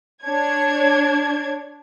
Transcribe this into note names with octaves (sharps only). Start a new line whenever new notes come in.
D4 C#5 G#6